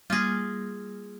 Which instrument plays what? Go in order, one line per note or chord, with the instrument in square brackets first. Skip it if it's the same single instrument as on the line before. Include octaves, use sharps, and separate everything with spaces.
[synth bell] G3 A#3 [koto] F4 G#4